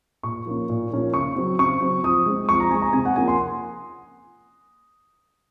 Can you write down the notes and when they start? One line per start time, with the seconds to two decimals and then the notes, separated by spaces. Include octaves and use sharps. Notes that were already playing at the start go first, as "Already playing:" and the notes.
0.23 A#2 C#6
0.46 F3 A#3 C#4
0.69 A#2
0.91 F3 A#3 C#4
1.13 C#3 C#6
1.36 F#3 C4
1.59 C#3 C#6
1.81 F#3 C4
2.03 F3 D#6
2.26 G#3 C4
2.49 F3 C#6
2.60 A#5
2.70 G#3 C4 G#5
2.82 A#5
2.93 C3 G#5
3.05 F#5
3.16 F3 A#3 C#4 G#5
3.28 C6